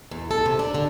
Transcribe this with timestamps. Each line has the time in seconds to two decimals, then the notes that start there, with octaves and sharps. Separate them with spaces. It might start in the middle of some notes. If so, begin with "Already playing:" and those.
0.11 E2
0.31 A4
0.46 C3
0.59 D4
0.75 D3